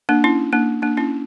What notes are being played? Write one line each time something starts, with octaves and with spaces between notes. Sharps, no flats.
A#3 D4
C#4 E4
A#3 D4
A#3 D4
C#4 E4